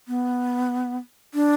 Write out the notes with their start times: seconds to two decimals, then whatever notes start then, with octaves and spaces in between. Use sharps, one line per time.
0.08 B3
1.34 D4